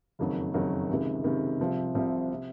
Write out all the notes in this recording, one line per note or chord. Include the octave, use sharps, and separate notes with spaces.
F#1 F2 D#3 F#3
F#1 F2 D#3 F#3
C#2 C3 D#3
C#2 C3 D#3
C2 C3 F3 C4
C2 C3 F3 C4
C3